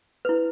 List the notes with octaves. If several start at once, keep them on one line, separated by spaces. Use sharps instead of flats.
E4 B4